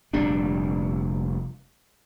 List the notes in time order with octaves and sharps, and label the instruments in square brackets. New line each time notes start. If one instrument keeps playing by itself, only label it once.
[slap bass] F1 A#2 G3 D4